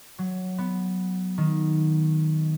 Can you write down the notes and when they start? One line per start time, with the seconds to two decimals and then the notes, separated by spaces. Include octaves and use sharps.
0.19 F#3
0.58 B3
1.38 D#3